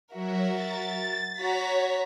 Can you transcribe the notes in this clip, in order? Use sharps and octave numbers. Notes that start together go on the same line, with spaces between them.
F#3 F#4 A#4 E5
A6
F#4 C#5 A#5 B6